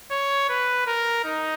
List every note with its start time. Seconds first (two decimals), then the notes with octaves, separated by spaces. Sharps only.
0.11 C#5
0.50 B4
0.87 A#4
1.25 D#4